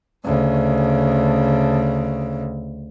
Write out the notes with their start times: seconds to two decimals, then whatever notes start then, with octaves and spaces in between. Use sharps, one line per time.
0.25 D2 C#3